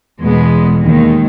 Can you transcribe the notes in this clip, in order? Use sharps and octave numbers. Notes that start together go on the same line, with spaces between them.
E2 B2 G#3 B3
D#2 D#3 G#3